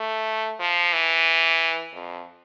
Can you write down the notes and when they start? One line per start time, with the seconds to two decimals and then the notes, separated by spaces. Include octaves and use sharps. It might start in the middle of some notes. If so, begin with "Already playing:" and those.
Already playing: A3
0.60 F3
0.94 E3
1.94 F2